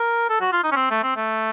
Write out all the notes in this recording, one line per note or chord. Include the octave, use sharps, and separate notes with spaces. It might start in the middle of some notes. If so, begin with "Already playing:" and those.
Already playing: A#4
A4
F#4
F4
D#4
C#4
C4
A3
C4
A3